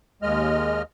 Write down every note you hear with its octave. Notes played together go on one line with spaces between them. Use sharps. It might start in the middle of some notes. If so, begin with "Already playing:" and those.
D#2 G#3 D#5 F6